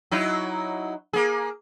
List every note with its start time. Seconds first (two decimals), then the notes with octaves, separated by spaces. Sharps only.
0.11 F#3 D#4 E4
1.13 A#3 G#4